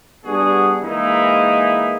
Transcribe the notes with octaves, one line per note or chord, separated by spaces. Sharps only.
G3 B3 D4 F#4 G#4
E3 G#3 A#3 D#4 E4